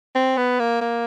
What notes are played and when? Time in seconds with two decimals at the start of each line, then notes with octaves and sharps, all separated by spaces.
0.15 C4
0.37 B3
0.59 A#3
0.81 A#3